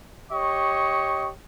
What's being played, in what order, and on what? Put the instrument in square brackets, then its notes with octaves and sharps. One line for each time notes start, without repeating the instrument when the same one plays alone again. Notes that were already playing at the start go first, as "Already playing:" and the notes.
[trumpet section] G4 C#5 D#5 C#6